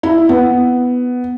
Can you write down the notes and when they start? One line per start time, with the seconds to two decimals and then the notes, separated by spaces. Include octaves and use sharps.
0.03 E4
0.29 B3